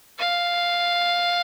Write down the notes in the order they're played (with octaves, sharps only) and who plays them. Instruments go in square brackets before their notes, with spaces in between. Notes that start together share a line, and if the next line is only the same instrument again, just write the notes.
[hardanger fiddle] F5